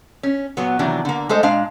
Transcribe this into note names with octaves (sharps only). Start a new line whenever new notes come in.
C#4
A#2 F#3 B3
C3 D#3 E3 F#3 D4
D3 A#3
G#3 A3 A4 C5 D#5
A#2 G#3 D4 F5